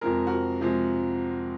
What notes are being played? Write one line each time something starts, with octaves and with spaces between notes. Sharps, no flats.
F2 C3 F3 G#3 A#4
F#4 A#4
C3 F3 G#3